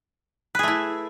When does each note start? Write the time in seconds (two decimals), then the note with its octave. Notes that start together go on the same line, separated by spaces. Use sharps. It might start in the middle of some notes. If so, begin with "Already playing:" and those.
0.55 B4
0.59 G#4
0.63 A3
0.68 E4